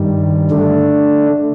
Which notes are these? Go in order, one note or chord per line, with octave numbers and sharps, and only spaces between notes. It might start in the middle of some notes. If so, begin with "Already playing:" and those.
Already playing: G2 D#3 G3
D3 A3 D4